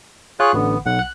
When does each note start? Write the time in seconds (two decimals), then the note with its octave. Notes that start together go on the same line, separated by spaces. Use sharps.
0.40 F4 G#4 C#5 F#6
0.53 A1 D3 B3
0.86 B1 F#5
0.99 F#6